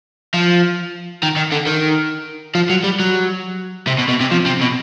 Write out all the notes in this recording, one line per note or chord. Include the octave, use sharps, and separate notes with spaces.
F3
D#3
D#3
D3
D#3
F3
F#3
G3
F#3
C3
B2
B2
C3
F3
C3
B2